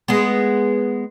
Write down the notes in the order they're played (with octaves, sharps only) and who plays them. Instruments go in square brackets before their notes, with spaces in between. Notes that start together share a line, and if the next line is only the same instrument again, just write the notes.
[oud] G#3 B3